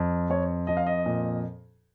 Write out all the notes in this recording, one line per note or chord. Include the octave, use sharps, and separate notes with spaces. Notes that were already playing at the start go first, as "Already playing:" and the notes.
Already playing: F2
F2 C#5
F2 D#5
F5
D#5
A#2